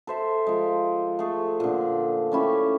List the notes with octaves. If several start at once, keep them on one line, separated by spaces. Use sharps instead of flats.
A4 C5 E5
F3 G#3
A3 G#4
A#2 D3
A3 C#4 E4 G4